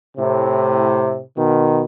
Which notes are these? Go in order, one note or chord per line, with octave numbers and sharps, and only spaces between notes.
A2 C3
B2 D#3